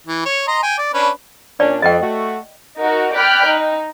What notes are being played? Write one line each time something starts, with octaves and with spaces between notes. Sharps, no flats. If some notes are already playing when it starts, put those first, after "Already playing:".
E3
C#5
D#5 A#5 C6
G5 G#5
D5
C#4 D4 B4
A#2 C#4 D4 D5
F2 D#5 G5
A3 F#4
D#4 F#4 A#4
D5 G5 B5 F6 F#6
D#4